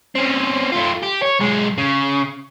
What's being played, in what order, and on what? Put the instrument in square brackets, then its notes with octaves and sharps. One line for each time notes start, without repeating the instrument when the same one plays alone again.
[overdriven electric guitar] C4 C#4
A3 F4
G4
C#5
B1 G#3
C#3